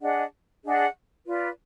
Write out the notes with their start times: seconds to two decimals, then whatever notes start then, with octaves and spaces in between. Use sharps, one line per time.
0.01 D4 G#4 D#5 F#5
0.64 D4 G#4 D#5 F#5
1.27 F4 B4 D5